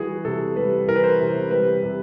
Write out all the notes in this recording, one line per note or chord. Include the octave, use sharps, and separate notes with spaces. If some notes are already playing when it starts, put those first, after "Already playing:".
Already playing: E3 G3 F#4 G#4
C3 A4
G3 B4
E3 A#4
B4
C5
C3
G3 B4
C3